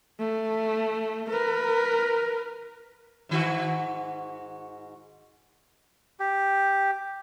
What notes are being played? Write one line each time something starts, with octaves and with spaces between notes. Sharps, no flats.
A3
A#4 B4
G#2 D#3 F#4
G4